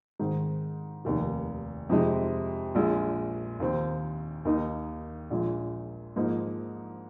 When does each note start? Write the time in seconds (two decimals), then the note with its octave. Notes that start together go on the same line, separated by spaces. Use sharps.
0.19 G#2 D#3 C4
1.05 F1 D#2 D#3
1.89 F2 C3 G#3 D#4
2.75 A#1 A#2 G#3
3.60 D#2 D#3 C4
4.45 D#2 D#3 A#3 D#4
5.30 A#1 A#2 G#3
6.16 G#2 F3 A#3 D#4